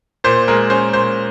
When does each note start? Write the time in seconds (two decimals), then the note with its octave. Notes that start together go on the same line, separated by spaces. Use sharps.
0.24 A#2 C5
0.48 G#3 A#4
0.70 C#4 C5
0.93 A#2 C5